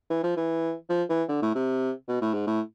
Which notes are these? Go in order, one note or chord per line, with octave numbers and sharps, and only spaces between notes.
E3
F3
E3
F3
E3
D3
A2
C3
B2
A2
G#2
A2